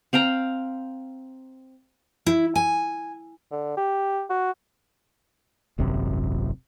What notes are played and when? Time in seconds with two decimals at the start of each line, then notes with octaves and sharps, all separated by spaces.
0.13 C4 F5 G5 A#5
2.26 E4
2.56 G#5
3.51 D3
3.77 G4
4.30 F#4
5.78 D#1 G#1 F#2 C3